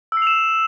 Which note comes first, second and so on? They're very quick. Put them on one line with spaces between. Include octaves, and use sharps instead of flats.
E6 C7 F7 E7